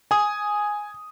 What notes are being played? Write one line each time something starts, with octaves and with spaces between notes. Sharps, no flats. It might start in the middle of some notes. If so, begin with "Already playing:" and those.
G#5 D#6